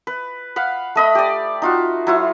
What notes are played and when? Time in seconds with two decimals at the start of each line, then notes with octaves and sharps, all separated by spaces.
0.07 B4
0.56 F5 F#5 B5
0.95 A3 D#5 B5
1.15 G4 D5
1.62 D#4 F4 F#4
2.07 F#3 E4 F4